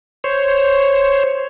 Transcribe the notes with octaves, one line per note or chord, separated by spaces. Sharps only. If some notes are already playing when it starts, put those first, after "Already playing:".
C5 C#5